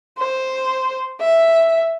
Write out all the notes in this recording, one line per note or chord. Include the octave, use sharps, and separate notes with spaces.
C5
E5